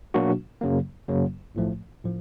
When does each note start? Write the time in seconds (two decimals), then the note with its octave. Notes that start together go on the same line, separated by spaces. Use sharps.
0.14 B2 F#3 A#3 D4 F#4
0.61 F#2 C#3 F#3 A#3
1.08 F#2 C#3 F#3 A#3
1.55 B1 A2 F3 A3
2.04 A2 F3